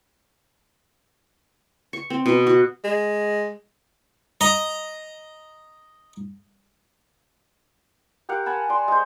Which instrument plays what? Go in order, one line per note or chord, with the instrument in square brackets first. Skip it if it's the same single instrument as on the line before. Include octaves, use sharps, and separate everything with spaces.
[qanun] C#6
C4
B2
F#4
[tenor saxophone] G#3
[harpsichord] D#5 A#5
[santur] G4 A#4 F5 F#5
F#5 G#5 A5 B5
D5 C6
G#3 C5